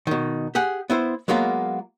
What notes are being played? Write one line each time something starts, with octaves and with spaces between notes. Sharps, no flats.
B2 D#3
G4 G#4 F#5
B3 E4 C5
F#3 G#3 A#3 B3 F4